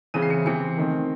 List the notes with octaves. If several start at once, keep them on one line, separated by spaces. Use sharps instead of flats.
C#3 E3 C4 E4 D#7
C7
C#7
C3 E3 C4 C#7
D#3 A3 C4